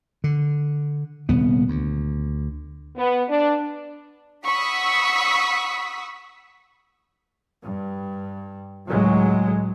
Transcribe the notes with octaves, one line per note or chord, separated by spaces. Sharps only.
D3
D#1 C2 B3
D2
B3
D4
F#5 B5 C#6 D#6 E6 B6
G2
C#2 A2 F#3 G#3